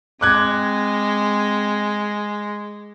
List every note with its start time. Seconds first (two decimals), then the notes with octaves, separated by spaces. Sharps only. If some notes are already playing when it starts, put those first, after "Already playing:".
0.21 G#3 C4 D6 F#6 G#6